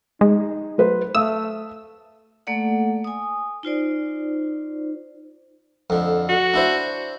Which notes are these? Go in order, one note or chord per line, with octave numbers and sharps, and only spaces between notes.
G#3 D#4
F#3 B4 C5
A3 E5 F5 D#6 E6
A3 A#3 A4 D5 F#5
G#5 D#6
D#4 F4 C5 D5
F2 D3
F#4
D4 E4 C5